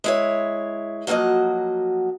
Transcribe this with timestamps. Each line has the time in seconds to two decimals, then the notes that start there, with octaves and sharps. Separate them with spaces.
0.04 G#3 E4 C#5
1.07 F3 F#3 A#3 F#4 D#5